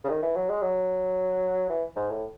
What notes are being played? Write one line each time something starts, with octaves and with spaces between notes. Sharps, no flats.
C#3
D#3
E3
F#3
G#3
F#3
E3
G#2
A2